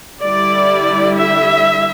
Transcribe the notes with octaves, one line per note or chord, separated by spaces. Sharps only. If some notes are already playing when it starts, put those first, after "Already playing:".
D3 G3 E4 D5
E5